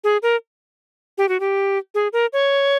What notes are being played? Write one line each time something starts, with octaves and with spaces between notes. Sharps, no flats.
G#4
A#4
G4
F#4
G4
G#4
A#4
C#5